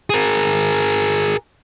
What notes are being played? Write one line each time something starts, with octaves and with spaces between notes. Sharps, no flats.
G#4 A#4